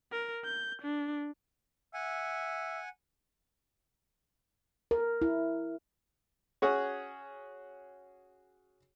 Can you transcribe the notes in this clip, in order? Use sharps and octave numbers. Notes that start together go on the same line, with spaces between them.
A#4
G6
D4
E5 F#5 G#5
A#4
E4
C#4 F#4 G#4